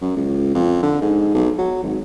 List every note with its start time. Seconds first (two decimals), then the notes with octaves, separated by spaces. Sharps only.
0.01 F#2
0.17 C#2
0.55 F2
0.83 D3
1.02 G#2
1.35 B1
1.58 F#3
1.83 G#1